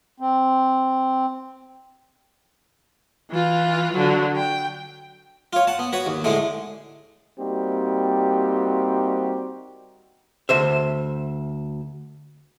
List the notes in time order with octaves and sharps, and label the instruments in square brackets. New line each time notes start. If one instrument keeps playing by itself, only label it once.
[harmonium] C4
[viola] E3 F4
D3 F#3
G5
[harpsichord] F4 C#5
F#5 A5
B3
F#4 B4 C#5
D#2
A2 D3 G#3 A3
[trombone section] G3 A#3 C4 D#4 F#4 G4
[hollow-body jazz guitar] D2 C5 E5